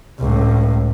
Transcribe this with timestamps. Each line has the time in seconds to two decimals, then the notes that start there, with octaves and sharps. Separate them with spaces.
0.19 C#2 A2